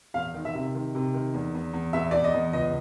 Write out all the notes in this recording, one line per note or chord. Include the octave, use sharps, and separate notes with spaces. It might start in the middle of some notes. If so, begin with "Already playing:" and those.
E2 F5
D#3
E5
C3
D#3
C3
D#3
E2
E2
E2
E2 E5
E2 D5
D#5
E2
C#2 D#5